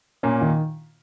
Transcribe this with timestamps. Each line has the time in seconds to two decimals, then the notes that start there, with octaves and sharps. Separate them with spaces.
0.23 A#2 A#3 C#4
0.41 D#3